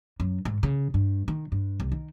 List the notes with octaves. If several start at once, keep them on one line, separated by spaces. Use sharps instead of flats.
F#2
G#2
C#3
G2
D#3
G2
C2
D#3